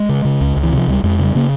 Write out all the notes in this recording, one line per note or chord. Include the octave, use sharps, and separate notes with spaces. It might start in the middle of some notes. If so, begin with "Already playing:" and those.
Already playing: G#3
C#3
C#3
C#2
C#2
E3
C3
F3
C#2 G3
F2 G#3
C#3
G3
C#3 A#3